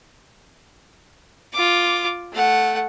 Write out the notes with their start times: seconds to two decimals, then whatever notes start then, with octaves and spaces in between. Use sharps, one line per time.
1.53 F4 D6
2.32 A3 F#5